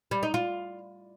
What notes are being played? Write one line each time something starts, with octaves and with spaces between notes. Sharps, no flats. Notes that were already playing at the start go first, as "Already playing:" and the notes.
G3
D#4
F4